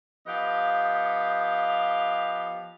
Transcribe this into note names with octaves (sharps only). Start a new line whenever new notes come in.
F3 B3 G4 D#5 F5